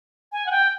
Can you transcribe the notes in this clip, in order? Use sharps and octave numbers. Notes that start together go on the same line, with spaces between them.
G#5
F#5
G5